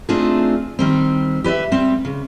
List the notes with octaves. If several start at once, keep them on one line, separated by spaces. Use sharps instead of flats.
A3 C4 D4 D#4 F4 G#4
D#3 G3 C4
G4 B4 D5 E5
G3 C4
C#3